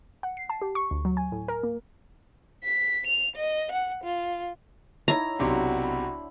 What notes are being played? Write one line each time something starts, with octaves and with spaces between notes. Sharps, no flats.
F#5
C7
A5
G4
C#6
D2
F#3
G#5
A2
A#4
A#3
B6
F7
D#5
F#5
F4
D#4 E4 C#5 A#5
B1 C3 D4 F#4 C5 F#5
B5